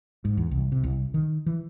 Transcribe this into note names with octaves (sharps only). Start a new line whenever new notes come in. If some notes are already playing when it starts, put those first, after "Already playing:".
G#2
E2
C2
C3
C2
D#3
E3